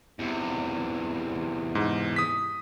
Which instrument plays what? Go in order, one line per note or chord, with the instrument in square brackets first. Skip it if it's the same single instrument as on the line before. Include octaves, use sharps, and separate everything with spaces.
[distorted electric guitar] E2 C3
[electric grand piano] G#2
D#6 B6